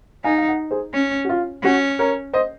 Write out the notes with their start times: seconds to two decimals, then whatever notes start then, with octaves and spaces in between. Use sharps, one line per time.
0.24 D#4 F5 G#5
0.38 F5
0.48 D#5 F#5
0.71 G#4 C5
0.94 C#4
1.25 F#4
1.29 F4
1.63 C#4 F#4
1.99 A#4 C#5
2.33 C5 D#5